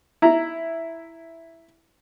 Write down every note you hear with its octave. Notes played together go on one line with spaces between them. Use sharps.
E4 A#5